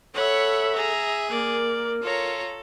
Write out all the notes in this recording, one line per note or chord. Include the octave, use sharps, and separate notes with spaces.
A4 C#5 E5 F#5 B5
G#4 A#5
A#3 A#4 D5
F4 A4 C#5 A#5